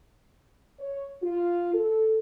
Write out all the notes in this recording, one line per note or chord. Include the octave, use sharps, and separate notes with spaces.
C#5
F4
A4